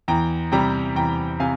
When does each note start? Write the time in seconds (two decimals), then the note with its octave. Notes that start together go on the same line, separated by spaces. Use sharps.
0.08 E2 G5 A#5
0.52 C3 G3 G5 A#5
0.96 E2 G5 A#5
1.40 C3 F5 G#5